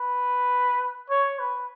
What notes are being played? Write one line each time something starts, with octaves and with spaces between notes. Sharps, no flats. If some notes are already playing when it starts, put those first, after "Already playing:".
Already playing: B4
C#5
B4